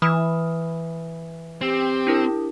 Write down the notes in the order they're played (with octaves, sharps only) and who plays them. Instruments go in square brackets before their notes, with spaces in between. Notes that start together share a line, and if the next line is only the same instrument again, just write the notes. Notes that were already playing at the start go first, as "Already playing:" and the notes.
[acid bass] E3 [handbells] B5 D#6 F6
[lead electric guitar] C4 [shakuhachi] G4
[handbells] D4 E4 A#4